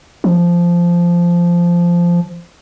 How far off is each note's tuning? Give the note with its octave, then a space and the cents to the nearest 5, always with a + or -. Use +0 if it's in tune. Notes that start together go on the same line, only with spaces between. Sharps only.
F3 -10